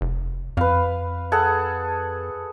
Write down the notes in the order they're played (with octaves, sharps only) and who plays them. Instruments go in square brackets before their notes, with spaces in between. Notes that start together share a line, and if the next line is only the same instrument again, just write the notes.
[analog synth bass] F1
[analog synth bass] F2 [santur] B4 F5
[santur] G#4 A4 F#5